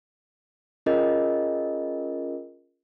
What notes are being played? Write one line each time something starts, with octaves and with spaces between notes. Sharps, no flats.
C#4 F4 G#4 A#4 D#5